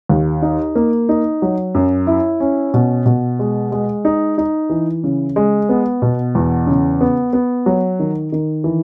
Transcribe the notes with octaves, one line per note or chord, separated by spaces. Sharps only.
D#2
D#4
A#3
D#4
F#3
F#2
E4
C#4
B2
B2
G#3
G#3
D#4
D#4
E3
C#3
G#3
B3
B2
E2
C#3
B3
B3
F#3
D#3
D#3
E3